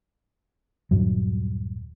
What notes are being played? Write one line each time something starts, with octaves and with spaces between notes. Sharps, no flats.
D#1 E2 G2 F#3